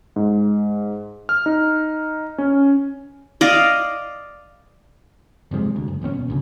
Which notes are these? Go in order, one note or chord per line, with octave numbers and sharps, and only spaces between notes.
G#2
F6
D#4
C#4
D5 D#5 F5
F#1 C3 F3 G#3
D2
F#1
D1 A1 C4 C#4
B2
D1 D2 C#3